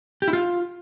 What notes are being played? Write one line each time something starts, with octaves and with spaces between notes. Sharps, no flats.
G4
E4
F4